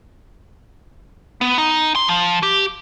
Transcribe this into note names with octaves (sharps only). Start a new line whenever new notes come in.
B3
D#4
C6
F3
G4